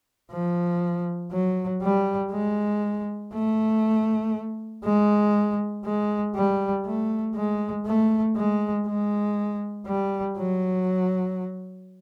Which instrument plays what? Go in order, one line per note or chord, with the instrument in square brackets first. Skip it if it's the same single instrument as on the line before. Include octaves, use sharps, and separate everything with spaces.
[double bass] F3
F#3
G3
G#3
A3
G#3
G#3
G3
A3
G#3
A3
G#3
G#3
G3
F#3